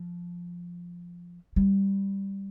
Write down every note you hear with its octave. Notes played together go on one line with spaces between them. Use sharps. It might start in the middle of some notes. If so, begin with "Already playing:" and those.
Already playing: F3
G3